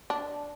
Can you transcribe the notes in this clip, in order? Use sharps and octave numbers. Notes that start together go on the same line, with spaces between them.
D4